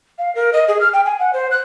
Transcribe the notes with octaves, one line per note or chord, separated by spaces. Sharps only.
F5
A#4
D#5
G#4
F6
G5
G#5
F#5
C5
F#6